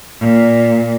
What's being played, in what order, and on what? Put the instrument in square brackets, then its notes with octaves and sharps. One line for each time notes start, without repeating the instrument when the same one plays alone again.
[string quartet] A#2